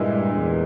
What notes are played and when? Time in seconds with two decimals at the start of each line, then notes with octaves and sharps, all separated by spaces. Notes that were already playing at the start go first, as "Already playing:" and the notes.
Already playing: G2 A#2 G#3 E4
0.34 E2